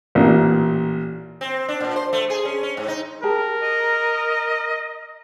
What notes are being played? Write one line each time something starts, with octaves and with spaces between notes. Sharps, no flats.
A1 A#2
C4
D4
A#2
C5
A3
G#4
C#4
C#4
G#2
D#4
G4 G#4 A#4 A5
D#5